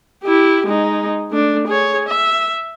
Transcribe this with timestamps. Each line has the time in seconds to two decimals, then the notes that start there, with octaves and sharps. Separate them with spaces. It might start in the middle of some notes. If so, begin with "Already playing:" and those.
0.24 E4 G4
0.66 G#3 D#4
1.31 A3 D4
1.68 G#4 C#5
2.08 E5